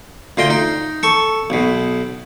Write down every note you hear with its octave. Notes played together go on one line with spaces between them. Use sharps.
D2 F4 D#5 G5
D#4
A4 C#6
B1 B2